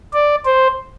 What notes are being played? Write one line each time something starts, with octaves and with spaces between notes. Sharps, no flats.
D5
C5